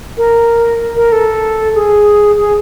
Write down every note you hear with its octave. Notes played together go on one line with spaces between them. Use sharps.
A#4
A#4
A4
G#4
G#4